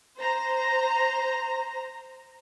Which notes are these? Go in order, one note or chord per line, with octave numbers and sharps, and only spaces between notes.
C5 A#5